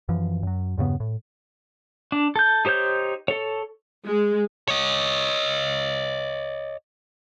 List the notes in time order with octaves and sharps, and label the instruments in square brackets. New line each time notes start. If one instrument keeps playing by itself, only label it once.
[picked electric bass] F#2 E3 F3
F#2 F#3
E2 G2 C#3 B3
A2
[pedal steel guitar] D4
A4 G6
D#4 G4 C5 C#5 G6
A4 C#5
[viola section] G#3
[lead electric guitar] C#5 D#5